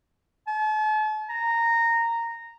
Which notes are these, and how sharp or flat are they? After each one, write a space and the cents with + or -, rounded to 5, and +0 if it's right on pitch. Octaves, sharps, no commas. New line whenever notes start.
A5 -40
A#5 -10